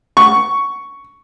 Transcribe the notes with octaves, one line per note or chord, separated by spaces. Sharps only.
C#6